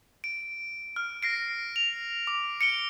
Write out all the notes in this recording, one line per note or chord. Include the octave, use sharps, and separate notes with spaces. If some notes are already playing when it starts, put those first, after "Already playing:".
D7
F6
A#6 C7 D7
F7
D6
C#7 D7 G7